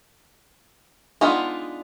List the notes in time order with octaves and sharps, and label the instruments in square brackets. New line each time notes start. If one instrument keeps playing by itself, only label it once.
[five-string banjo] G#3 B3 D4 D#4 F4